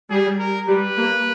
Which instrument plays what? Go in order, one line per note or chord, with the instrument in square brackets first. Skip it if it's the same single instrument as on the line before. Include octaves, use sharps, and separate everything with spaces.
[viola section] G3 [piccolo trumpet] G#4
[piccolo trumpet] A#4
[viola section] G3 [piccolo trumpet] B4
[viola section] A#3